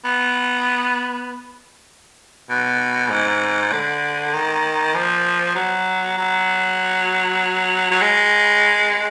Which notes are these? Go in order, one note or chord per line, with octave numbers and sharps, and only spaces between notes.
B3
B2
G#2
D3
D#3
F3
F#3
F#3
F#3
G#3